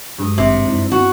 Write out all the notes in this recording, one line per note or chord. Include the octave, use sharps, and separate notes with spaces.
G2 F#3 G#3 D#6
G#1 C3
F#2 G#3 C4 D#4 E4 D5
B3 F#4 A5